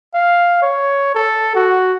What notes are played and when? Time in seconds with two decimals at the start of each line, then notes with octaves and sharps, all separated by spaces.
0.14 F5
0.62 C#5
1.15 A4
1.55 F#4